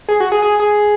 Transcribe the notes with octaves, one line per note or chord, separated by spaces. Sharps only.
G#4
F#4
G#4
G#4
G#4